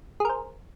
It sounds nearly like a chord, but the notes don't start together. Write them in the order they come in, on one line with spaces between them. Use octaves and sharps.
G#4 A#4 C5